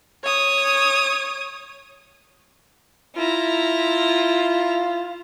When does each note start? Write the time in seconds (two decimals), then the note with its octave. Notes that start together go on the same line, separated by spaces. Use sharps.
0.24 C#5 D#6
3.16 E4 F4 A#5